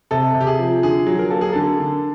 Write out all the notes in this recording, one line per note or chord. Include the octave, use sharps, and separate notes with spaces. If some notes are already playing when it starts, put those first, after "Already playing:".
C3 A4
C3
G4
G#4
F3
D3 G#4
F#3
A#4
A#3 A4
G#4
D3 A4
D3